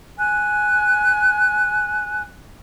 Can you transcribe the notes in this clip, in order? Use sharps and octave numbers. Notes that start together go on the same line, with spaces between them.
G#5 F#6